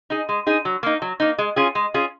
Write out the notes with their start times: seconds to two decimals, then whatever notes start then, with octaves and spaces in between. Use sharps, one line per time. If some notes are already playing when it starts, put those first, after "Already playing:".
0.10 D#4 G#4
0.29 G#3
0.47 D#4 G#4
0.65 F#3
0.83 A#3 D#4
1.02 F#3
1.20 A#3 D#4
1.38 G#3
1.56 C#4 F4 G#4
1.75 G#3
1.94 C#4 F4 G#4